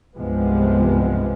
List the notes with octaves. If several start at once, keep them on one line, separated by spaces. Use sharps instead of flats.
C2 G2 C3 F3 G#3 B3